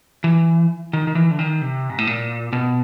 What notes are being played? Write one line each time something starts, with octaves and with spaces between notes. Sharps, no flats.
E3
D#3
D#3
E3
D3
D#3
C3
G#2
A2
A#2
B2